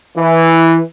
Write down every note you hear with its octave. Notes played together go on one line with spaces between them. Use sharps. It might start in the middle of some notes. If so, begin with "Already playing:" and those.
E3